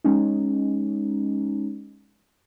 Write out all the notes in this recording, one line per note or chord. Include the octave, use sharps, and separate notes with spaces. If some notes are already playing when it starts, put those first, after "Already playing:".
G#3 C#4 D#4